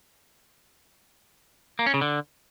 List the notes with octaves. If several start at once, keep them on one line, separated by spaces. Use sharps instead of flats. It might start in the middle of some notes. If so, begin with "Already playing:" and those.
A#3
C#4
C#3
D3